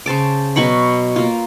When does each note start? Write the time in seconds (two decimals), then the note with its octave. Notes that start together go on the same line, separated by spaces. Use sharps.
0.06 C#3 C5 A5 D6
0.56 B2 F#3 B5 C#6
1.16 A#3 F4